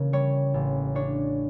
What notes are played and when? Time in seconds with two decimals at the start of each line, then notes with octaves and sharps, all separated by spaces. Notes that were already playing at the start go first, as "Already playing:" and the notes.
Already playing: C#3 E3 A#3
0.13 G3 C#5
0.54 A1
0.95 D4 C#5